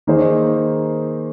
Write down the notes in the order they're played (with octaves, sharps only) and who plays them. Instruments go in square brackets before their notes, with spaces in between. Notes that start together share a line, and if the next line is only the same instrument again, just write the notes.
[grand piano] D#3 A#3 D#4 G#4 C5